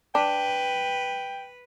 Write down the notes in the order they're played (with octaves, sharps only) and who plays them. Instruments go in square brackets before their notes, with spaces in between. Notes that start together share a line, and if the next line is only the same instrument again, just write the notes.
[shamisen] D4 [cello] B4 [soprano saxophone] G5